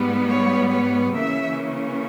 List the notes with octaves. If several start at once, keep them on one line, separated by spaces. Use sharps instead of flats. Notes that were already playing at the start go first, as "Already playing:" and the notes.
Already playing: G#2 G3 B3
C#5
C#5
C#3 E3 A#3 C#4 E5